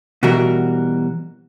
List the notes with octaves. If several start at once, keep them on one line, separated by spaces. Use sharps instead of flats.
B2 E3 G3 F#4 A#4